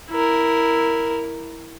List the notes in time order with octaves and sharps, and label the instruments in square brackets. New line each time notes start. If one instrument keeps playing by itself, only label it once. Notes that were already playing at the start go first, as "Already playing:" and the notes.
[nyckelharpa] E4 A#4